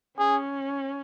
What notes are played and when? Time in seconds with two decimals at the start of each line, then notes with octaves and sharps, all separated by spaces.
0.19 C#4 G#4